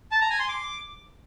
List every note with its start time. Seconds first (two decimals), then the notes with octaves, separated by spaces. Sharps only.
0.11 A5
0.21 A#5
0.30 G#5
0.39 C6
0.49 D6